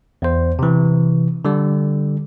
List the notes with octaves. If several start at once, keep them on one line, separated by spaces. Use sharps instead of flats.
E2 C5
C3 E3
D3 G3